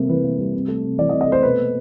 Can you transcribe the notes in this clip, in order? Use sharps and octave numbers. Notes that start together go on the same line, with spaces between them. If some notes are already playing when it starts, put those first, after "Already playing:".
Already playing: C3 G3 A3 A#3
E3 B4
A#3
G3
C3
A3
C3
E3 D5
D#5
C3
D#5
A3 C5
B2 B4
A#3